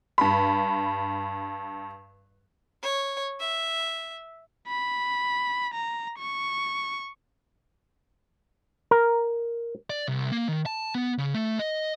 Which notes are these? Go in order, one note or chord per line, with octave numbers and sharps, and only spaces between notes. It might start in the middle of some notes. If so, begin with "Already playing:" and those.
G2 B5
C#5
E5
B5
A#5
C#6
A#4
D5
C2
A#3
D#3
A5
B3
C#3
A3
D#5